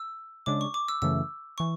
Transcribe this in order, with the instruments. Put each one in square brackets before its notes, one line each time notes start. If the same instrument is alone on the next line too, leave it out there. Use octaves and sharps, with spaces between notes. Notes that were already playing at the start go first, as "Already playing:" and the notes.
Already playing: [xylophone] E6
[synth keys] C#3 G#3 D4 [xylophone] D6
[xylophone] C#6
D6
E6
[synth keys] F#2 C#3 E3 A3 [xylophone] E6
[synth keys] E3 [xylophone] C#6